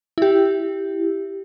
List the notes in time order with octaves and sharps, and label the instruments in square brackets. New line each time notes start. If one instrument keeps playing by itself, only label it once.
[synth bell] E4 G4